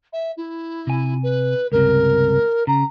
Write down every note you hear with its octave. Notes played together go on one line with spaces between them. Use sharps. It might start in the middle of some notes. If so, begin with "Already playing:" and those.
E5
E4
C3 G#5
B4
C#2 G2 C3 A#4
C#3 A#5